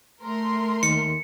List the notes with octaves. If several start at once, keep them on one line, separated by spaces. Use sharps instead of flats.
A3 A#4 C6
D#2 D#3 C#7